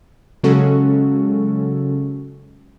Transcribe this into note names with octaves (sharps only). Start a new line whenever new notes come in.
C#3 F#3 G#3 C#4 F#4 A4